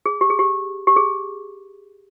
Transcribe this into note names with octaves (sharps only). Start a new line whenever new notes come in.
G#4
G4
G#4
G4
G4
G#4